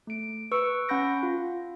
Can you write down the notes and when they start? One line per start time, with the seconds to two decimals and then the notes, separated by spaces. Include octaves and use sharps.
0.07 A3 D7
0.52 B4 C#6 E6 C#7 D7
0.88 C#4 F#5 B5 G6 A#6 D7
1.23 F4